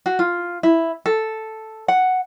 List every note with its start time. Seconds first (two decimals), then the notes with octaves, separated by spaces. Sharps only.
0.06 F#4
0.19 F4
0.63 E4
1.06 A4
1.88 F#5